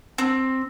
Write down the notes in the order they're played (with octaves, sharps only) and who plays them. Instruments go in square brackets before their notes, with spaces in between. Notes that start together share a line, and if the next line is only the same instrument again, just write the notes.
[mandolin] C4